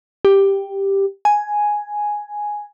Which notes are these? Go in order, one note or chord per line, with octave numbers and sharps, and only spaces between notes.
G4
G#5